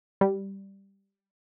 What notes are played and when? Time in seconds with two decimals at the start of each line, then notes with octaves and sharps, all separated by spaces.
0.21 G3